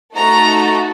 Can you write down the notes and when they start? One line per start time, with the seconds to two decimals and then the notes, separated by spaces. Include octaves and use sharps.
0.15 A3 D#4 F#4 A4 A#5